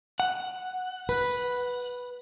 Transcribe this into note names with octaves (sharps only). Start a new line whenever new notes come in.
F#5
B4